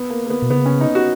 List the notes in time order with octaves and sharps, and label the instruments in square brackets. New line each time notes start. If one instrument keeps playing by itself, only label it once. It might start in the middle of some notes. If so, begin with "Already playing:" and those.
Already playing: [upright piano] B3
A#3
A#3
B3
[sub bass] B2
[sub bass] C#3 [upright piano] B3
[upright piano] C#4
D#4
F#4